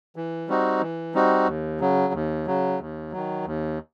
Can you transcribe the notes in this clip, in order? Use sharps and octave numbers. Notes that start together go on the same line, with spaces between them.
E3
G3 C4 D#4 F#4
E3
G3 C4 D#4 F#4
D#2
C#3 F#3
D#2
C#3 F#3
D#2
D#3 F#3
D#2